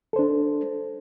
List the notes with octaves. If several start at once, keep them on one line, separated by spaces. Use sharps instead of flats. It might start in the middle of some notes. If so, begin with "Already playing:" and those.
D4 A4 C5